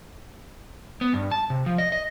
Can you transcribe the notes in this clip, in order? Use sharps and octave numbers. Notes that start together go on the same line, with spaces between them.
B3
G2
A5
C3
F3
D#5
D#5